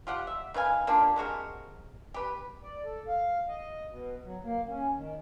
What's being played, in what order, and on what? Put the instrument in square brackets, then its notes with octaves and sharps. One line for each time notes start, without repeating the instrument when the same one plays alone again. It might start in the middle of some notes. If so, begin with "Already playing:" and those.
[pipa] F4 G4 F#5
E5
D#3 B4 F5 G#5
A#3 D4 F4 G4
C3 G#3 F#4 A#4
G4 B4
[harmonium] D5
A4
F5
D#5
B2
F#3
A#3
C#4
D#3